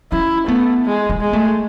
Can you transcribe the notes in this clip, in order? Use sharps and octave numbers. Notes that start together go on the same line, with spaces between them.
C#4 E4
A3 B3
G#3
B3
G#3
A3